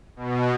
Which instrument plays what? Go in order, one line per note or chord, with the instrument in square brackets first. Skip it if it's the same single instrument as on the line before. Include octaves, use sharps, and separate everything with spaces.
[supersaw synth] B2